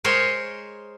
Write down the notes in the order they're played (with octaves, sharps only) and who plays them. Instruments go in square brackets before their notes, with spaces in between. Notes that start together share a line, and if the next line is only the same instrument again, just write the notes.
[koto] G#3 A#4 C5 C#5 G#5